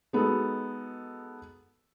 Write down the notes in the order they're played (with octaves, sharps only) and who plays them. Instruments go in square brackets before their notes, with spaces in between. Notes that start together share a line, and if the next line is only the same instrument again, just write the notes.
[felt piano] G#3 B3 D#4 F#4 A4